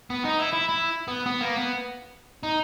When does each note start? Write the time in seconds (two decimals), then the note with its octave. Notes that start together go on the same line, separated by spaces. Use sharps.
0.10 B3
0.25 D#4
0.39 E4
0.53 E4
0.69 E4
1.08 B3
1.26 B3
1.41 A#3
1.56 B3
2.43 D#4